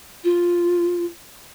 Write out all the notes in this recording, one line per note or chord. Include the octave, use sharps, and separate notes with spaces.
F4